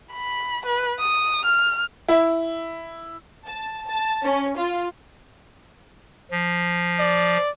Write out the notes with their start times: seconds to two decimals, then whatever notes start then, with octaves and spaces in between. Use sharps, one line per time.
0.12 B5
0.66 B4
0.99 D#6
1.45 F6
2.08 E4
3.47 A5
3.87 A5
4.23 C#4
4.57 F4
6.31 F3
6.99 D5